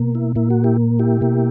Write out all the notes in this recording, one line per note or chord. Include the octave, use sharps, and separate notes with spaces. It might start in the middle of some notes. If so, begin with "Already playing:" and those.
Already playing: B2 A#3
E4
A#2 A#3 E4
F#4
E4 G4
E4 G4
B2 A#3